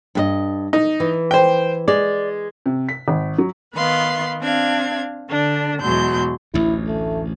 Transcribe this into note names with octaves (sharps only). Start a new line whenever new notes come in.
G2 B4 D#5
D#4
E3
C5 G5
G#3 D5
C3
B6
G#1
F#3
D#3 B3 B4 F5 C6
C4 D4 F5 G#6
D3 D4
E2 B2 F#3 G#3 C6 G6
A1 D2 E4
A3